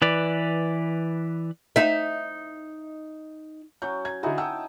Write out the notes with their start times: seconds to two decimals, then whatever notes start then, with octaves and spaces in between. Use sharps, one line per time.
0.02 E3 B4 D5
1.76 D#4 E5
3.82 F#3 C#4 F#4 G6
4.05 A#5 G#6
4.23 D3 D#4 E4 F#4 G#5
4.38 F#5 G5 A5 D#6 E6